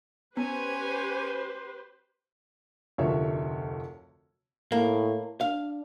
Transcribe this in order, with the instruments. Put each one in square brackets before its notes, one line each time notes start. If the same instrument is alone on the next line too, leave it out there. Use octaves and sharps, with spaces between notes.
[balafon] B3 [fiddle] C#4 G#5 [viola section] G4 B4 C5
[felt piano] F1 D2 F3 A#4 C#5 E5
[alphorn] A2 [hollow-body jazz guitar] A#3
[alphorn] D4 [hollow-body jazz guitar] F5